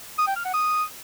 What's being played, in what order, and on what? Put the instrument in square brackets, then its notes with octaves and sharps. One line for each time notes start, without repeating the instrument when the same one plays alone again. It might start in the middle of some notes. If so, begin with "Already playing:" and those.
[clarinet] D#6
G5
F6
F#5
D#6